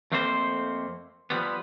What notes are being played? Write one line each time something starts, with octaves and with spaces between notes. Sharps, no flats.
F2 A3 A#3 C4 E4 C5
F3 G3 B3